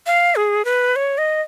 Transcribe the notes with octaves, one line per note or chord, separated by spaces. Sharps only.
F5
G#4
B4
C#5
D#5